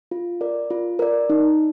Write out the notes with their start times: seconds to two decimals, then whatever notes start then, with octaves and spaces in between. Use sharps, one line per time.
0.11 F4
0.41 A#4 D5
0.70 F4
0.99 A#4 D5
1.30 D#4